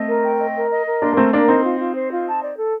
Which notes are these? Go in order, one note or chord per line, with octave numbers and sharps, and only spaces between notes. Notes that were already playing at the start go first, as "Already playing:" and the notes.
Already playing: A3 C4 D#5
A#4
G5
D#5
A#4
D#5
A#4
A#3 D4 C6
A#3
A3 C4 A#4
A#3 D4 A#4
C4 D#4 C6
F4
F4
C5
F4
A5
D5
A4